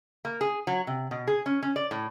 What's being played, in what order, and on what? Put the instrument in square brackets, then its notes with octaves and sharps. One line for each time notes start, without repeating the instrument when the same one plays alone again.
[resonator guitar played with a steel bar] A#3
G#4
F#3
C3
B2
G#4
C#4
C#4
D5
A2